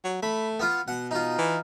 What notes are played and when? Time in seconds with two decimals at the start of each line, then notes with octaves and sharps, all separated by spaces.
0.05 F#3
0.23 A3 B5
0.60 B3 F4
0.88 B2 F#5
1.11 D#4 F4
1.38 E3